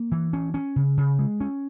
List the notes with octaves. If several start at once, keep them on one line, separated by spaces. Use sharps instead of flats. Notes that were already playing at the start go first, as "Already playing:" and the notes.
Already playing: A#3
E3
C#4
C#4
C#3
C#3
G#3
C#4